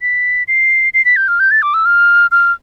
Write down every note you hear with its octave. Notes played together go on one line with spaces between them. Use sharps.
B6
C7
C7
B6
G6
F6
G6
A6
D6
E6
F6
F6